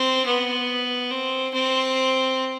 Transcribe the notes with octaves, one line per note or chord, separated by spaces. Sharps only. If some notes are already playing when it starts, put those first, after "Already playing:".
Already playing: C4
B3
C4
C4